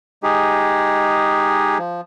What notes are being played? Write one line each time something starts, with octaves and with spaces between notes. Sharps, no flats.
G#3 D#4 G4 G#4
F3